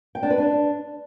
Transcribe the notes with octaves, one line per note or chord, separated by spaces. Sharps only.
G5
D4
B4
D4